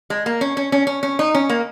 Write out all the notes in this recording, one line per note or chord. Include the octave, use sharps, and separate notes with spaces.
G#3
A#3
C#4
C#4
C#4
C#4
C#4
D#4
C#4
A#3